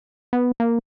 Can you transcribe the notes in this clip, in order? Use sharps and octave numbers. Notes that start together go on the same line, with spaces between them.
B3
A#3